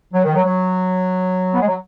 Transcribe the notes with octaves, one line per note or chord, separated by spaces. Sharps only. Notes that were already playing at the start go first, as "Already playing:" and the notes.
F#3
D#3
F#3
F#3
B3
G#3
F#3